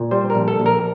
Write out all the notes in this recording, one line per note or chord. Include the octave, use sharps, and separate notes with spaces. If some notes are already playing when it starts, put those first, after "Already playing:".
Already playing: A#2
G3 C5
A#4
A#1
A4
A#1
A#4